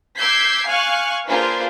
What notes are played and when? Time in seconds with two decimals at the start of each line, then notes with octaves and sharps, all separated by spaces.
0.18 D6 E6 G6 G#6 B6 C7
0.67 F5 G#5 C#6 F6 F#6
1.26 A#3 D4 F4 G#4 B4 C5